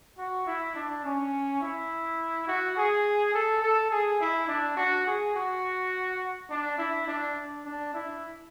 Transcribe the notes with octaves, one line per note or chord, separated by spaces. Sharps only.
F#4
E4
D4
C#4
E4
F#4
G#4
A4
A4
G#4
E4
D4
F#4
G#4
F#4
D4
E4
D4
D4
E4